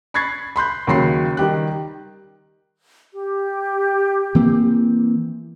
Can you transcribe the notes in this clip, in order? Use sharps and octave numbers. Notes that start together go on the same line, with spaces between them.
B5 C#6 F#6 G#6 A6 C7
B5 C6 F#6 G6
D#2 C#3 F#3 B5 C6 C7
D#3 G3 G4 F#6
G4
E3 A#3 C4